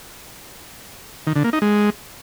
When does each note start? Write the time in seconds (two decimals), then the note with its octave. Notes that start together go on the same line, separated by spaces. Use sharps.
1.27 D#3
1.36 D3
1.44 A#3
1.53 D#4
1.62 G#3